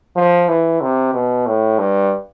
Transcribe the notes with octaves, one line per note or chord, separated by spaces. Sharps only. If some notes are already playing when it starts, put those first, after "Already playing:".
F3
E3
C3
B2
A2
G2